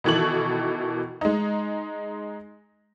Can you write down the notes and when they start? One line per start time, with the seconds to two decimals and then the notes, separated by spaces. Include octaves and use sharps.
0.04 B2 D#3 E3 A4 C#6 F#7
1.21 G#3 D#4